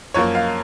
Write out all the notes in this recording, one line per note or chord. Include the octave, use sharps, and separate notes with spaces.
F#2 F3 A#3 C#5
F5